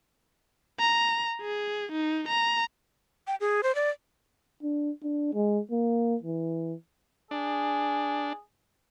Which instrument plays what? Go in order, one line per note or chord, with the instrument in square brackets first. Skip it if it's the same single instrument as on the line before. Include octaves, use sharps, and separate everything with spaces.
[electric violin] A#5
G#4
D#4
A#5
[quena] G5
G#4
C5
D5
[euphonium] D4
D4
G#3
A#3
E3
[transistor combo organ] D4 [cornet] G#4